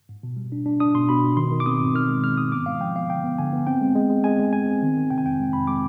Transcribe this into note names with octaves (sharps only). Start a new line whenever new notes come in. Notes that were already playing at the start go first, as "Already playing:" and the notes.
G#2
B2
G3
D4
D4
D4 D#6
B2 C6
B2 B5
B2
D#3 C6
D#3
D6
C4 D#6
G#2
D#3 F6
G#3
G#3 F6
G#2 D#6
B3 D6
G#3 F5
F3 G5
B3 F5
D3 G5
B3
D3 G#5
B3
C4 G5
G#3
G#3
G#3
G#3 G#5
G#3
G#3 G#5
C4
D#3
D#3
C3 G5
G#5
F2 G5
G#3
F2 B5
G#3 D6